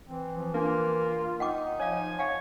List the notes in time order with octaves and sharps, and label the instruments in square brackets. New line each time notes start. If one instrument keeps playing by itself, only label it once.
[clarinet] E3 [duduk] C4
[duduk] F3
[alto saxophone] A#3 [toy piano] D4 [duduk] F4
[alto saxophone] D#4 [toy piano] F#5 G5 D6
[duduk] F3 [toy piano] C#5 F5 [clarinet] G#5
[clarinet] C#5 [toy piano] F5 F#5 G#5